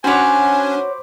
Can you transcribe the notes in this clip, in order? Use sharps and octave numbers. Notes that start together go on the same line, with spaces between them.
C#4 D4 F#4 C5 C#5 G#5 B5 D6